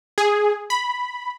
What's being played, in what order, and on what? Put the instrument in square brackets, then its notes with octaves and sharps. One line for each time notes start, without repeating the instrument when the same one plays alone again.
[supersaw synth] G#4
B5